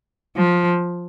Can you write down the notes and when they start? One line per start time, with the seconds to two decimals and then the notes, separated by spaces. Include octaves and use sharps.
0.37 F3